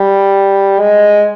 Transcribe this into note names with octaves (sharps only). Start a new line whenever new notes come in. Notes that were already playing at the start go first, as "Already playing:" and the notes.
Already playing: G3
G#3